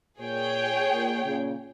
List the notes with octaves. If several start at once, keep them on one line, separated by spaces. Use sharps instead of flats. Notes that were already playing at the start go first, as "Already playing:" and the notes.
A#2 G#4 C#5 G5
A#2
A#2 C#3